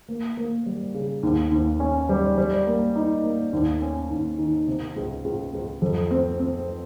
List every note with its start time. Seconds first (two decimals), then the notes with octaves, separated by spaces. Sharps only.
0.08 A#3
0.37 A#3
0.66 G3
0.94 C#3
1.23 D#2
1.51 D#2
1.80 C#4
2.09 G3
2.38 G3
2.66 A#3
2.96 D#4
3.24 A#3
3.53 D#2
3.82 C#4
4.10 D#2
4.38 D#3
4.67 C3
4.96 C#2
5.24 C#2
5.53 C#2
5.82 F2
6.11 C4
6.39 C4